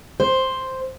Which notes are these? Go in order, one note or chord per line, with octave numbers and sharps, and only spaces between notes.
C5